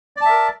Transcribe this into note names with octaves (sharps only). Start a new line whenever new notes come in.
A#4 D5 E5 A5